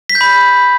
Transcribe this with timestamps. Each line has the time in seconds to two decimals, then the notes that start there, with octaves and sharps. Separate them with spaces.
0.10 B6
0.15 G6
0.21 B5